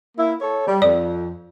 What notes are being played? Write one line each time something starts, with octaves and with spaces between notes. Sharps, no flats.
A#3 E4
A4 C#5
G3
F2 D5